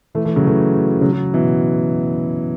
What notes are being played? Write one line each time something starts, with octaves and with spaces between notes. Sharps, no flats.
E3 A3
E3 A3
C#3 F#3
E3 A3
C#3 F#3
C#3 F#3
B2 E3